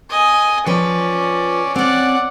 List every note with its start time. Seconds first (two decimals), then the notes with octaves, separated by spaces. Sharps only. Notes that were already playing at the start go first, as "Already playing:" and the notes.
0.10 D#5 G#5
0.66 F3 C#4 B4 D5
1.76 C4 C#4 D5 F#5